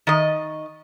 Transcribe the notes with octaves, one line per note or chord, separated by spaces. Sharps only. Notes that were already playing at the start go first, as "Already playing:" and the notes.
D#3 D#5